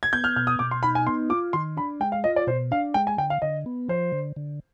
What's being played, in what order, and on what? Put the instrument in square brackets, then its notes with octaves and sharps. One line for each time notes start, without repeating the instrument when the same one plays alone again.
[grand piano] G#6
[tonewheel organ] B3 [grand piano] G6
[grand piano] F6
[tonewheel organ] B2 [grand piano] F6
[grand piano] D#6
[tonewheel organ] B2 [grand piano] D6
[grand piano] C6
[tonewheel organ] D#4 [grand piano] B5
[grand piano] G#5
[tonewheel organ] B3 [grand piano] C6
[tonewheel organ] F4 [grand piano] D6
[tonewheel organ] D#3 [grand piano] C6
[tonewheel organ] D4 [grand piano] B5
[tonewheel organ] G#3 [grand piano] G5
[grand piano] F5
[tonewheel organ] F4 [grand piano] D#5
[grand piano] D5
[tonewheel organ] B2 [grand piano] C5
[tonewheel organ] D4 [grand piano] F5
[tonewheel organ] G#3 [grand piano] G5
[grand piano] G#5
[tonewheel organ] D3 [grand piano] G5
[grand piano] F5
[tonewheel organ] D3 [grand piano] D#5
[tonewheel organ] B3
[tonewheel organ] F3 [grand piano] C5
[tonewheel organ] D3
D3